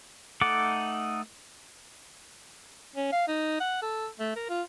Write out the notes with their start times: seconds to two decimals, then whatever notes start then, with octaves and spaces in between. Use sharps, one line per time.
0.41 A3 D#4 A4 F#5 D6
2.96 C#4
3.12 F5
3.28 D#4
3.60 F#5
3.82 A4
4.19 A3
4.36 A#4
4.49 F4